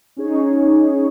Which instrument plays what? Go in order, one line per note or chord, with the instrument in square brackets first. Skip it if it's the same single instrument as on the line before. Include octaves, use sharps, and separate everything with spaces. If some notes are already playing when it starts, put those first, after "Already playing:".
[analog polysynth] C#4 D#4 G#4 C#5